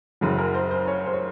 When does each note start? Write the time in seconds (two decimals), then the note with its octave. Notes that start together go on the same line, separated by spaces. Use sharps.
0.21 F#1 F#2 C#3 F#3
0.39 A#4
0.54 C5
0.71 C5
0.88 C#5
1.06 C5
1.13 C#5